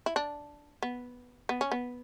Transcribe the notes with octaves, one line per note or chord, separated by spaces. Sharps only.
E4
D4
B3
B3
C#4
B3